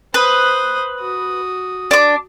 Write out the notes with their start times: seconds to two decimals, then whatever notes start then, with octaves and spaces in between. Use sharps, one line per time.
0.14 B4 C5 D#6
1.00 F#4 D#6
1.91 D4 D6